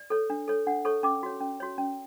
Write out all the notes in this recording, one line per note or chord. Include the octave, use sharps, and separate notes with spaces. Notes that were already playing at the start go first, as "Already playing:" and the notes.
Already playing: D5
A4 C#5
D4
A4 C#5
D4 F#5
A4 C#5 C#6
C#4 D6
F#4 C#5
C#4
F#4 C#5
C#4